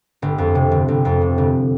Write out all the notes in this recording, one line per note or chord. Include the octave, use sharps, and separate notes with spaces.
G1
F2
C3
G1
G1
F2
C3
G1